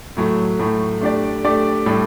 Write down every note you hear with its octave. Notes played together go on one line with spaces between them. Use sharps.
A2 F#3 A3
A2 F#3 A3
A3 D4 G4 D5
A3 D4 G4 D5
A2 G3 D4 A4